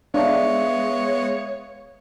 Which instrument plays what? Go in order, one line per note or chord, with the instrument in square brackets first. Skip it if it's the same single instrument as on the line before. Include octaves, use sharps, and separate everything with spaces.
[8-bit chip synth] G#3 B3 [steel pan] D4 [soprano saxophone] C#5 [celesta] E5 F5